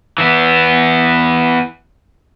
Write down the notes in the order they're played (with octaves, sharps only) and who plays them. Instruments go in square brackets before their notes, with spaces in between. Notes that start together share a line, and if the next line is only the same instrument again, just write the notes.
[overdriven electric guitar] E3 B3